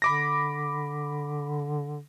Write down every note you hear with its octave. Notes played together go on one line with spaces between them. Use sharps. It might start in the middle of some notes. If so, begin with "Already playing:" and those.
D3 B5 D6 A#6